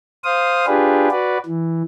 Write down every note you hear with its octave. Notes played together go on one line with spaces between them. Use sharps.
C5 F5 D#6
D4 F4 G4 G#4 B4
F#4 B4 D5
E3